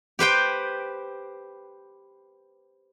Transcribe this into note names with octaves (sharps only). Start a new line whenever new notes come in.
G4 B4 C5 G5